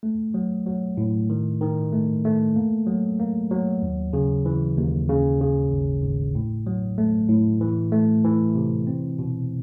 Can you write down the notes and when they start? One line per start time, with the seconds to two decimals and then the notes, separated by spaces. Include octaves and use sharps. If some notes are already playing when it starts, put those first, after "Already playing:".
0.03 A3
0.34 F#3
0.66 F#3
0.97 A2
1.30 D#3
1.61 D#3
1.93 A3
2.25 A3
2.56 A#3
2.87 F#3
3.19 A#3
3.51 F#3
3.82 D#2
4.13 C#3
4.46 E3
4.77 D#2
5.09 C#3
5.40 C#3
5.71 G#1
6.03 G#1
6.35 A2
6.67 F#3
6.98 A3
7.29 A2
7.61 E3
7.92 A3
8.24 E3
8.55 C3
8.87 C4
9.19 B2